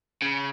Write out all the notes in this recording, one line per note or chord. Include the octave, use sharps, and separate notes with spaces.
C#3